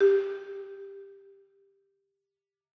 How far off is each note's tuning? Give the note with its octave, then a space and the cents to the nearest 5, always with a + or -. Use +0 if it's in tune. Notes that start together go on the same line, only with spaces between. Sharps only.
G4 +10